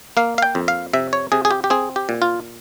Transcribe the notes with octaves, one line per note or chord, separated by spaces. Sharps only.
A#3 F5
F5
G5
F2
F5
C3 E5
C#5
C3 G#4
G#4
G4
G4
C4 G#4
G4
A#2
F4